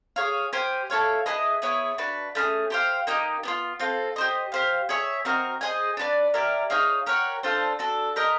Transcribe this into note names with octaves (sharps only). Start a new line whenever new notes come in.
G#4 C#5 F5
G4 C5 F5 G#5
E4 A4 C#5 F5
E4 G#4 B4 D#5
B3 E4 G#4 C#5
D4 F#4 B4
A3 C#4 E4 G#4
G4 C5 F5
A#3 D#4 G4
B3 D4 F4
C4 F4 A4
G4 C5 D#5
G4 C5 F5
G#4 C#5 E5 G#5
C4 D#4 F#4 A#4
G#4 C5 D#5 G#5
D4 F#4 B4 D5
E4 G4 A#4 D5
D#4 G#4 C#5 F5
G4 A#4 C#5 F#5
D4 F4 A4 C5
D4 F#4 A4
G4 A#4 D#5